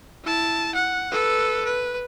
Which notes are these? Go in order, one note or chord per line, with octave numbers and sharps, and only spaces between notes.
E4 A5
F#5
A4 B4
B4